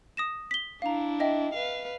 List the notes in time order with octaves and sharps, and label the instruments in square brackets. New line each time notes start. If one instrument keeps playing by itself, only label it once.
[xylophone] D#6 A#6 E7
B6 G7
[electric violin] D4 E4 [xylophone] F5 A#5
[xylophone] D#5 E5 G5
[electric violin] B4 F5